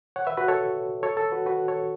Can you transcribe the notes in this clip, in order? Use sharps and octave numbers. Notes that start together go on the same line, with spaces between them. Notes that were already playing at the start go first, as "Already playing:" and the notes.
C#5 F#5
B4 E5
F#4 B4
A4 C#5
A4 C#5
A4
F#4 B4
F#4 B4
A4 C#5